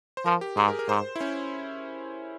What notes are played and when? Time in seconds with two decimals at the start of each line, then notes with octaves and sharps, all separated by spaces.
0.17 C5
0.26 F3 A#4
0.41 G4
0.57 G#2 G#4
0.68 A#4
0.79 A#4
0.89 G#2 C5
1.16 E4
1.21 C#4